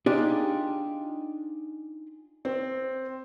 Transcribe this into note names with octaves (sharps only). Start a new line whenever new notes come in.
D4 D#4 F4 G4 G#4
C4